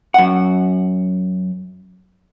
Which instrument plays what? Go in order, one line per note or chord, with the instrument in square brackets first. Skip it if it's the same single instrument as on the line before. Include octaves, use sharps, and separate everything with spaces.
[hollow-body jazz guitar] F#2 F#5